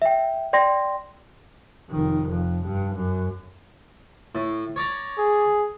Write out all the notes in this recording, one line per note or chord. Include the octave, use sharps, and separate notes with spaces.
E5 G5
D5 G5 C6 A#6
F1 D#3
F2
G2
F#2
A2
C#5 D5 A#5
G#4